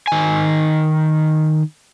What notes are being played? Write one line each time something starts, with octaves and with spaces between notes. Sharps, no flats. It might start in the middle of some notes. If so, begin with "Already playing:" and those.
D#3 G#5